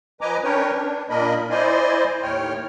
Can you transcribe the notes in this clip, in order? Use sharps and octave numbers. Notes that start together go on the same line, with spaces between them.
F3 B4 D#5 G#5 A#5 D6
C#4 D4 A#4 B4 C#5 G5
D4
A#2 A#3 D4 A#4 D#5 B5
E4 C5 D5 D#5 G#5 C6
D#2 A2 C#5 G5 F6